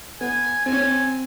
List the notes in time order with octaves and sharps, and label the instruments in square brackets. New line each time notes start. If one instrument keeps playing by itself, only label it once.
[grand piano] B3 [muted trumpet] G#5
[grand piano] C4 [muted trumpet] G#5
[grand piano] C#4
C4